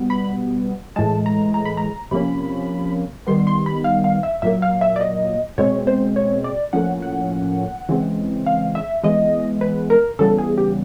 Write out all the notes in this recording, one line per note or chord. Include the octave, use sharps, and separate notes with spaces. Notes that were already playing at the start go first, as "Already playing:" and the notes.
Already playing: B2 G3 B3
B5
A2 E3 G#3 A5
A#5
A#5
B5
A#5
C3 F3 A#3 C#4 B5
D#3 G3 B3 C6
C6
B5
F5
F5
E5
A#2 F#3 A#3 E5
F5
E5
D5
D#5
B2 G#3 C4 C#5
C5
C#5
D5
A2 F3 A#3 C#4 F#5
F#5
C#3 E3 G#3 C4
F5
E5
E3 G#3 B3 D#5
B4
A#4
C#3 E3 G3 B3 A4
G#4
G4